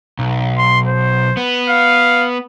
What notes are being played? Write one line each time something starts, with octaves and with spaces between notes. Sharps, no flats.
B1
C6
C5
B3
F5